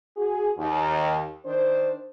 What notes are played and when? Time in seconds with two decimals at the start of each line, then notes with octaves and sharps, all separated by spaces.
0.17 F#4 G#4
0.57 D#2
1.45 D#3 D4 C5